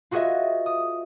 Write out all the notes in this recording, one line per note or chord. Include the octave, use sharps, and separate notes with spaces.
F4 F#4 G#4 B4 D#5 E5
D#6